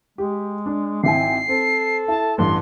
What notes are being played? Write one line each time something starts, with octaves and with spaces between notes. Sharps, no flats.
G#3 G4
D4
G#1 C4 E4 G#5 C7
C4 A4
E4 A5
A1 G2 C6